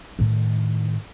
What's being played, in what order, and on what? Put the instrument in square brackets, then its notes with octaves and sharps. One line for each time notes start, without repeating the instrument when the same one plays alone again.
[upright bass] A2 D#3